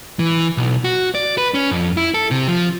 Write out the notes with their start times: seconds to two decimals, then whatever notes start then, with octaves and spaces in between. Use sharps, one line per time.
0.19 E3
0.57 B1
0.84 F#4
1.15 D5
1.38 B4
1.54 C#4
1.71 F2
1.97 E4
2.14 A4
2.31 C3
2.48 F3